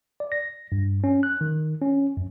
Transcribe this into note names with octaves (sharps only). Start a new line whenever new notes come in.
D5
A#6
G2
C#4
F#6
D#3
C#4
F#2